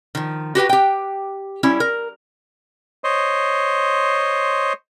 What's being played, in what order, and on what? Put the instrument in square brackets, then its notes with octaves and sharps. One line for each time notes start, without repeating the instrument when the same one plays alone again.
[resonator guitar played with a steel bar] D#3 F3
F#4 G4 B4 G5
G4 G5
G3 C#4 E4
A#4
[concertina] C5 C#5 D#5 C6